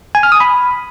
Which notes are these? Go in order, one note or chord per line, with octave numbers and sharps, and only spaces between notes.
G#5
F6
D#6
B5